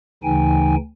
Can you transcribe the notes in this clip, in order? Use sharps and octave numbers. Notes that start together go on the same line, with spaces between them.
D2 C#3 E3 D#4 G5 G#5